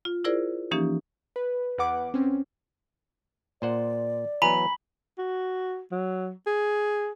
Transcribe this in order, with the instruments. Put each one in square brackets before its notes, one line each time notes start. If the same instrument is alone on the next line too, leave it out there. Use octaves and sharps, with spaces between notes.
[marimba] F4
E4 F4 G#4 A#4 C5 D5
E3 F3 A#3 C#4 D#4 G4
[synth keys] B4
E2 B4 F#5 D6
C4 C#4
[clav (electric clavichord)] A#2 C5 F#5 [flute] D5
[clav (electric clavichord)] E3 F#3 B3 [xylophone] G#5 A#5 [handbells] B5
[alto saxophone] F#4
F#3
G#4